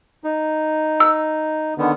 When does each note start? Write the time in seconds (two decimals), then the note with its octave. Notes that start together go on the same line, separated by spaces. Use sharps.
0.24 D#4
1.00 E6
1.78 D3 D#3 B3